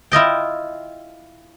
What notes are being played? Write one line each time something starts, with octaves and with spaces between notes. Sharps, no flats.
E4 F4 D#5 G5